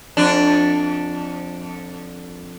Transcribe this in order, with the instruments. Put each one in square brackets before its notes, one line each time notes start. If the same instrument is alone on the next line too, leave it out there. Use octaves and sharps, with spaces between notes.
[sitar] F2 D4